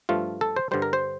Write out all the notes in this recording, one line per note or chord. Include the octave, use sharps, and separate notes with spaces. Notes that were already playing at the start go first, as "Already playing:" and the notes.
G2 F3 A3 F4
A4
C5
G2 D3 G3 C5
A#4
C5